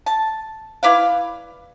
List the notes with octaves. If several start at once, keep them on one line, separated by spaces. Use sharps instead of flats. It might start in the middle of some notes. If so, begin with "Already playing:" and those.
A5
E4 B4 D5 F5